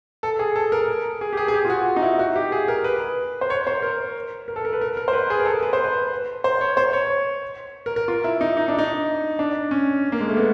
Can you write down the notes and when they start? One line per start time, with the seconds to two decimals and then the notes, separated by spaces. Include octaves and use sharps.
0.23 A4
0.39 G#4
0.56 A4
0.72 A#4
1.21 G#4
1.33 G4
1.37 G#4
1.48 G#4
1.54 G4
1.65 F4
1.70 F#4
1.96 D#4
2.03 E4
2.19 F#4
2.36 G4
2.52 G#4
2.68 A#4
2.84 B4
3.41 C5
3.50 C#5
3.67 C5
3.82 A#4
4.48 A#4
4.56 A4
4.65 A#4
4.73 B4
4.81 A#4
4.97 A#4
5.08 C5
5.13 B4
5.30 G#4
5.40 A#4
5.46 A4
5.63 B4
5.73 C5
5.84 B4
6.44 C5
6.61 C#5
6.77 C5
6.93 C#5
7.86 A#4
7.96 A#4
8.08 F4
8.24 E4
8.41 D#4
8.57 D#4
8.68 D4
8.78 D#4
9.39 D4
9.71 C#4
10.12 A#3
10.20 G#3
10.29 A3
10.37 B3